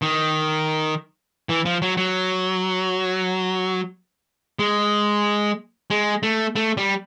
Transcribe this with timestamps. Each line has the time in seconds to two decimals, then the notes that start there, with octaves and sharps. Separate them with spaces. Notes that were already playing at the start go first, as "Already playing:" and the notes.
0.02 D#3
1.49 E3
1.65 F3
1.82 F#3
1.97 F#3
4.59 G#3
5.90 G#3
6.23 A3
6.56 A3
6.77 G3